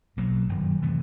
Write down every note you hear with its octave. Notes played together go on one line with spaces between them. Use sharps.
B1 B2 F#3 A#3
G1 F#2 D#3 F#3
C3 E3 A3